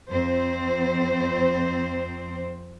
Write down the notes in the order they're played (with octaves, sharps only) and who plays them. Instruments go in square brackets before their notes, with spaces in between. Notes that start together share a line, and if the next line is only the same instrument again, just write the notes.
[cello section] F2 C4 C5